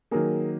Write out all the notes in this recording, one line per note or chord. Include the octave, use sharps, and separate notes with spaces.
D#3 F#3 A#3 G#4 A#4